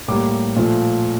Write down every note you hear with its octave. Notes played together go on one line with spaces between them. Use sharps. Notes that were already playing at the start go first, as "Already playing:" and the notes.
A2 G3 A#3 D6
A#2 F3 A3